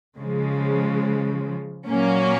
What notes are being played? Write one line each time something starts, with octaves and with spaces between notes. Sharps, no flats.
C#3 F3 G#3
A#2 F#3 A#3 C#4